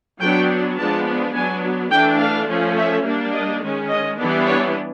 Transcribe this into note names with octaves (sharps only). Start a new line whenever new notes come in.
F#3 B3 D4 G5
F3 G#3 B3 D4 A5
F#3 B3 D4 G#5
E3 A3 D4 G5
F5
F3 A3 C#4
E5
G3 A#3 D4
D#5
D#3 G#3 C#4
D#5
E3 G3 B3 D4
C#5